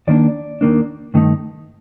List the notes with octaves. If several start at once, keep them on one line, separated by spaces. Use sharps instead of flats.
D#2 D#3 A#3 D4 D5
D#2 D#3 A#3 D4
G2 D#3 A3 D#4